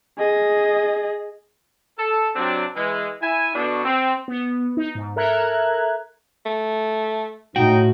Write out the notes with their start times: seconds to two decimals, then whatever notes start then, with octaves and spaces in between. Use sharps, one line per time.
0.18 G#4 D#5
1.98 A4
2.35 C3 F#3 C4 D4
2.76 E3 G#3
3.21 E4 G#5
3.54 B2 B3 D4 F#4 A4
3.84 C4
4.28 B3
4.77 D#4
4.95 G#2
5.16 A4 A#4 E5 A#5 F#6 G#6
6.46 A3
7.56 A2 D#4 F#4 G5